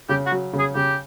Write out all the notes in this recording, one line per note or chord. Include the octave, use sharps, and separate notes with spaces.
C#3 G4
F#4
F#3
C#3
G#4
C#3 G4